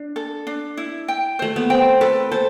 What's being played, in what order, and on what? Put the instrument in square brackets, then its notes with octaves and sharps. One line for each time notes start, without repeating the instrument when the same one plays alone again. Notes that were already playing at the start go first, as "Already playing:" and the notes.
Already playing: [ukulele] D4
A4
D4
E4
G5
[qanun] A3 [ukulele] C5
[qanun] B3
[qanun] C4 [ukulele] G5
[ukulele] A4 [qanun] B4
[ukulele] A4 [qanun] C5